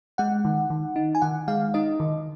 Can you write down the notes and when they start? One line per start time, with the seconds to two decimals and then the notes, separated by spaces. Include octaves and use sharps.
0.18 G#3 F#5
0.45 D#3
0.70 D#3
0.96 D#4
1.15 G#5
1.22 D#3 F#5
1.48 G#3 F5
1.74 D#4 D#5
2.00 D#3